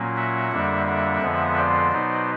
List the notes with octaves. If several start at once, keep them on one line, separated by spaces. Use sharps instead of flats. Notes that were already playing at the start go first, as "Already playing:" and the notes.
Already playing: A#2 F#3 A#3 C#4
E5 F#5
F2 D3 G3 A#3 D4
E5 F#5
F2 D3 F3 G#3 B3
C5 D5
B2 F#3 B3 D#4